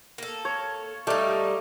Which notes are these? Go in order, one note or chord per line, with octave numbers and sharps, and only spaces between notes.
A#3 A4
C#5
G3 A3 D#4 D5 F5